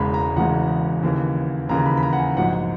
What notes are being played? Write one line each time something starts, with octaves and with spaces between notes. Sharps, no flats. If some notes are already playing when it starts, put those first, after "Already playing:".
Already playing: E1 E2 C#3 G#3 A#5 B5
A#5
E1 E2 C#3 G#3 F#5
D#2 C#3 E3
D#2 C#3 E3 A#5
A#5
B5
B5
A#5
F#5
G#5
A#1 G#2 F#3 F#5
F#5